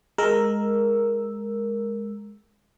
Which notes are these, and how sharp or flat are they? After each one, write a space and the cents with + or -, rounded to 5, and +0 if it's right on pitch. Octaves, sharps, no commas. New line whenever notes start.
G#3 +0 A#4 +0 E6 +0